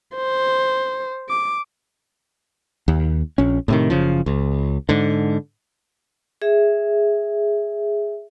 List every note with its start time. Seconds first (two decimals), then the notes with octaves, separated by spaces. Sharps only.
0.16 C5
1.29 D6
2.88 D#2
3.38 A#1 C#4
3.68 A2 C3 D#3
3.90 F#1 C#3 F3
4.26 C#2
4.89 G#2 D3
6.42 G#4 E5